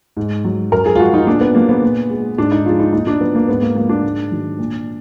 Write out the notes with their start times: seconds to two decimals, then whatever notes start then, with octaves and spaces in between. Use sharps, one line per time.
0.17 G#2
0.44 F#3
0.72 F#2 A#4
0.86 G#4
0.95 F4
1.00 F3 G#3 F#4
1.14 D#4
1.27 A#2 D4
1.41 B3
1.55 F#3 A#3
1.69 B3
1.83 A#2
2.10 G#3
2.38 G#2 D4
2.52 D#4
2.66 F3 G#3 F4
2.79 D#4
2.93 A#2 D#4
3.07 D4
3.21 F#3 B3
3.35 A#3
3.48 G#2 B3
3.62 A#3
3.76 F3 G#3 A#3
3.89 D4
4.04 G#2
4.31 D#3 F#3
4.59 A#2